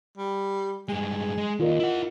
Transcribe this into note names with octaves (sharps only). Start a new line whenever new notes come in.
G3
G2 G#3 G#4
G#3
D#2 F4 A#4 D#5
E4 F#5